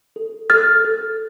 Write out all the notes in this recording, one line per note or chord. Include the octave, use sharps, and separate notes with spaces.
A4
A4 F6 A6
A4